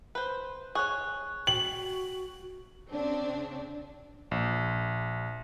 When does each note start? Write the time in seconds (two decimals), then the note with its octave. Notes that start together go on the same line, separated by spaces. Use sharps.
0.15 B4 C5
0.75 G#4 C#5 C#6 F#6
1.47 F#4 G5 F#7
2.91 C#3 C4 D4
4.31 A#1